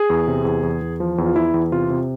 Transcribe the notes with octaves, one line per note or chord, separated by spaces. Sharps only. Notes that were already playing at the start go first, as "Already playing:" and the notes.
Already playing: G#4
E2
C3
E2
E2
E2
F3
E2
F4
E2 E4
E2
C3 F4
C3